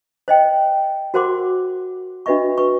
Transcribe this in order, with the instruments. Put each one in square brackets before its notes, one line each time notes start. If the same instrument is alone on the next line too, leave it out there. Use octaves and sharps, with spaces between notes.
[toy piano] C5 D#5 G5
F#4 A#4 C5 F#5 C6 D6
D4 F#4 B4 D#5 E5 C#6
B4 C#6